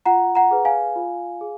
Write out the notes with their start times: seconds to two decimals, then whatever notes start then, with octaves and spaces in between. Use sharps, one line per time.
0.05 F4 F#5 A#5
0.35 F#5 A#5
0.51 G#4 B4
0.65 F5 G#5
0.96 F4
1.41 G#4